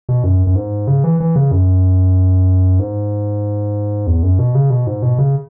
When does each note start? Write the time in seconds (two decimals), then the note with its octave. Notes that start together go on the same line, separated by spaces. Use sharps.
0.09 B2
0.24 F#2
0.47 F#2
0.56 G#2
0.88 C#3
1.04 E3
1.20 E3
1.36 C#3
1.51 F#2
2.79 G#2
4.07 E2
4.23 F#2
4.39 B2
4.55 C#3
4.70 B2
4.87 G#2
5.03 B2
5.19 C#3